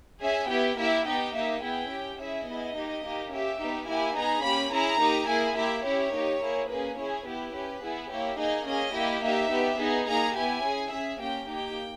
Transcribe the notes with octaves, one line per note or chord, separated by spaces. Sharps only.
C#4 G#4 E5
B3 E4 G4 G5
A#3 E4 G4 E5
B3 D#4 G4 G5
A#3 D#4 G4 E5
B3 E4 G#4 G5
C#4 G4
C#4 E4 G#4 E5
B3 E4 G#4 D#5
A#3 D#4 G4
A#3 D#4 G4
C#4 G4 E5
B3 D#4 G4
A#3 E4 G4 G#5
B3 D#4 G#4 A#5
A#3 C#4 G4 B5
C#4 E4 G#4 A#5
A#3 D#4 G4
A#3 E4 G#4 G#5
A#3 E4 G4 E5
C#4 E4 G4 C#5
A#3 D#4 G4
A#3 E4 G#4
A#3 C#4 G#4 B4
C#4 E4 G#4 C#5
B3 E4 G4 B4
C#4 G4 B4
B3 E4 G#4
A#3 E4 G4 C#5
A#3 D#4 G#4 D#5
A#3 C#4 G#4 D#5
A#3 E4 G4
A#3 D#4 G4 E5
B3 G4
B3 D#4 G#4
A#3 D#4 G#4 A#5
B3 E4 G4 G#5
C#4 G#4
C#4 G#4 E5
A#3 C#4 G4 G5
A#3 D#4 G4 G5